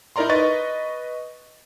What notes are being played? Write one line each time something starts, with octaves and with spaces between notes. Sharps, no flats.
D#4 E4 A#4 D5 A#5 C6
B4 D#5 C#6 A6